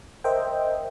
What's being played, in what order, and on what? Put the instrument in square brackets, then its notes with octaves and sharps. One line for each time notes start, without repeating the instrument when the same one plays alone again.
[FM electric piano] A#4 C5 D#5 E5 G5